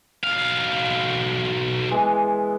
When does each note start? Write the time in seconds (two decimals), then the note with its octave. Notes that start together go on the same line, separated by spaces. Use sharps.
0.24 B1 F5
1.91 E3 G#3 B3